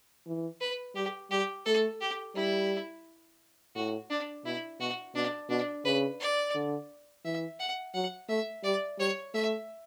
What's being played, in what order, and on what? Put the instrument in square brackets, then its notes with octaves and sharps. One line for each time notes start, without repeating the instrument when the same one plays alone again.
[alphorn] E3
[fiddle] B4
[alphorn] G3 [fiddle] G4
[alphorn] G3 [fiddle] G4
[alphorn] A3 [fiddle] A4
[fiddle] G4
[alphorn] G3 [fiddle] E4
[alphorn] A2 [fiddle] F#4
[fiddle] D4
[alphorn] B2 [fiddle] E4
[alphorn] B2 [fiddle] F#4
[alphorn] B2 [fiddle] D4
[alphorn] B2 [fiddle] D4
[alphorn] C#3 [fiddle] B4
[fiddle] D5
[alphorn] D3
[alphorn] E3 [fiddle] E5
[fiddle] F#5
[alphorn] F#3 [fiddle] F#5
[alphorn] A3 [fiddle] E5
[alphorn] G3 [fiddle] D5
[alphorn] G3 [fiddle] C#5
[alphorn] A3 [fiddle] E5